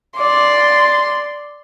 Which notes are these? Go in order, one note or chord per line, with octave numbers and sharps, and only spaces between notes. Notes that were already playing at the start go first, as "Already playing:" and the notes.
D5 C6